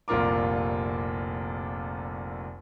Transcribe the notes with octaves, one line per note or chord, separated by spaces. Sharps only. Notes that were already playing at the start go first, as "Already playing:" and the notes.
F1 C2 A#2 F4 A#4 D6